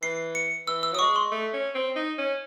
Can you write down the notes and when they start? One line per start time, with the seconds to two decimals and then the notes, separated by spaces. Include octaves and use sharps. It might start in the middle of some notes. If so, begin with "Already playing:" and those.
0.02 E3 C7
0.35 C#7
0.67 E3 E6
0.83 E6
0.92 F#3 D#6
0.99 G#3 C#6
1.16 C6
1.31 A3
1.53 C#4
1.75 C4
1.96 D#4
2.18 C#4